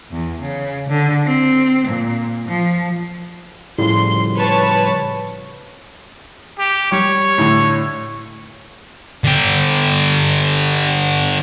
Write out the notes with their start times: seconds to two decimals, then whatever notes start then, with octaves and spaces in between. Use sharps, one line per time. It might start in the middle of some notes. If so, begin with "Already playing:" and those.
0.12 E2
0.43 C#3
0.89 D3
1.26 C4
1.88 A#2
2.48 F3
3.78 A2 C#3 F3 G3 C6
4.35 B4 C#5 A5
6.59 G4
6.92 G3 C#5
7.38 A2 D3
9.24 D3 G4